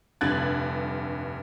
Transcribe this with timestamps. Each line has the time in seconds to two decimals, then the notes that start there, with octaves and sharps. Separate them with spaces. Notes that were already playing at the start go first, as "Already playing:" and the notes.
0.21 F1 G2 D3 F#6 G#6 A6